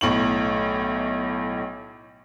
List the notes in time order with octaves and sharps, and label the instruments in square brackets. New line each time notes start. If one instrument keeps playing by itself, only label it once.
[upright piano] B1 A2 C#6 F#7